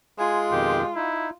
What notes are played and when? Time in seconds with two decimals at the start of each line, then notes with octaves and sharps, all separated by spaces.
0.19 G#3 F4 G#5
0.51 F2 B2 D#3 G4
0.95 D#4 E4